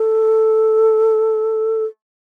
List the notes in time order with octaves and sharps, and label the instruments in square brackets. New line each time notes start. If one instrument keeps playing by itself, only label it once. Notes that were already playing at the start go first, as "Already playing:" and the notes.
Already playing: [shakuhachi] A4